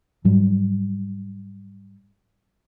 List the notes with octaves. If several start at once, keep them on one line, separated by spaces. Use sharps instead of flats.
G#2 F#3 G3